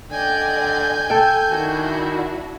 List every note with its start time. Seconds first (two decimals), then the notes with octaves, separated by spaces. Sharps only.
0.11 D3 D5 D#5 G5 G#5 G6
1.10 A4 G5
1.51 D#3 D4 E4 F#4